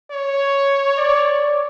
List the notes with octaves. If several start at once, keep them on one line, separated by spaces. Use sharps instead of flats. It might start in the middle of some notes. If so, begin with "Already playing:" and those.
C#5
D5